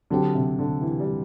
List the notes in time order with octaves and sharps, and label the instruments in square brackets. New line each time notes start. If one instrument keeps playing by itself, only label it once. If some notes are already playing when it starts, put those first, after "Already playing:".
[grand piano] D3 [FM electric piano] F#3 C4 G4
[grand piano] C3
D3
E3
G3